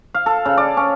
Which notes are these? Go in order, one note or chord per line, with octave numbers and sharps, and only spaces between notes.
F5
A4
C#3
D5
C#4